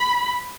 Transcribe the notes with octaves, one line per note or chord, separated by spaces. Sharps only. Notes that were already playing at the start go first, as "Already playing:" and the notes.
Already playing: B5